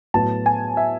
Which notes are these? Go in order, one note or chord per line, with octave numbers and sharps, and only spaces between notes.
A2 F#3 B3 A5
G#5
E5